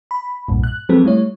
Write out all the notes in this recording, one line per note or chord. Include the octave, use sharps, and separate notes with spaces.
B5
B1 G2 A#2
F#6
F3 F#3 G#3 C4 A4 B4
G3 A3 E4 C#5